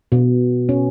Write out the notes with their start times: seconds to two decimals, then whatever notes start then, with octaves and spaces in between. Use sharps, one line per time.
0.12 B2
0.69 C#4